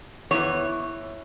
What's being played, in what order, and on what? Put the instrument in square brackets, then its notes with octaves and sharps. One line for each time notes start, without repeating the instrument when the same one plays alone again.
[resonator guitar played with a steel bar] E2 E3 C#5